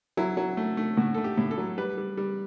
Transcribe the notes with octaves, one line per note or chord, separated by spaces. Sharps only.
F#3 E4
F#3
A3
A3
A2 F#4
A3 A4
G4
A2
A4
F#3
G3 B4
G3
G3